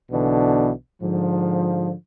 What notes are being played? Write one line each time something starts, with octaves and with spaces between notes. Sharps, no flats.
B1 B2 D3 E3 D4
G#2 D3 F3